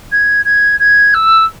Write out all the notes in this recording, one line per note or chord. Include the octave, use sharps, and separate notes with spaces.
G#6
G#6
G#6
E6